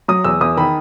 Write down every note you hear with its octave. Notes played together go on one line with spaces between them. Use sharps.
F#3 D#6
E2 E6
E2 D#6
D#3 B5